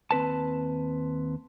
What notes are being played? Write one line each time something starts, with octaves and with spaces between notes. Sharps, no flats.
D#2 C4 B4 A5